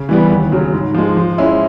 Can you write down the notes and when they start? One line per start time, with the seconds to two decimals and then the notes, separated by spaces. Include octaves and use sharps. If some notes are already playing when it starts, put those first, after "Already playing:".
Already playing: C#3
0.09 E3 G3 B3
0.30 D#2
0.52 C#3 F#3
0.73 G#2
0.94 F3 G#3
1.17 F3
1.38 G#3 C#4 E4